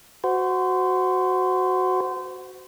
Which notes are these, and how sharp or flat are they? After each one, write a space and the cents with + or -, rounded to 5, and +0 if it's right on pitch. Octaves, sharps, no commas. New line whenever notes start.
F#4 +0 C5 -25